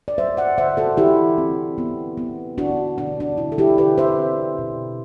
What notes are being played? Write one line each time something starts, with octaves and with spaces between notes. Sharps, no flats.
D5
F#3 C5 E5
D5 F#5
D3 C5 E5
F#4 A4
E3 E4 G4
C4
B3
B3
D4 F#4
B2 D4
D4
D3 E4
A4
E4 G4
D3 G4 B4
C5 E5
C4
B2